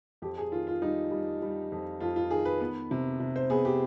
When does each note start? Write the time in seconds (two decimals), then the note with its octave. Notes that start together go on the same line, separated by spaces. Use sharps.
0.22 F2 G4
0.38 G#4
0.52 D#3 F4
0.67 F4
0.82 G3 D#4
1.11 G3
1.42 G3
1.72 F2
2.00 F2 F4
2.16 F4
2.31 D#3 G#4
2.45 B4
2.61 B3
2.91 C3
3.20 C3
3.36 C5
3.50 B3 G#4
3.65 G4